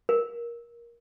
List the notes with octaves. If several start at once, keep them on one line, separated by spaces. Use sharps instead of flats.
A#4